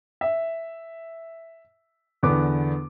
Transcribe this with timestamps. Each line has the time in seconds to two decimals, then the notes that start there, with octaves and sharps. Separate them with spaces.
0.21 E5
2.23 E2 D3 B3 D6